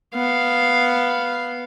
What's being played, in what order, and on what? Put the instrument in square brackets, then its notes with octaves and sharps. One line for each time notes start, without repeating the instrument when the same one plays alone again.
[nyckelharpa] B3 F5